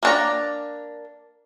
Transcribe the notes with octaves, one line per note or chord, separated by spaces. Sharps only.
A#3 D4 A#5